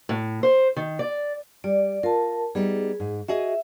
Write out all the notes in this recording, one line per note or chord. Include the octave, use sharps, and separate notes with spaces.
A2
C5
D#3
D5
G3 D5
F4 A#4 A5
G3 B3 D#4 G#4
G#2
F#4 G#4 D#5 E5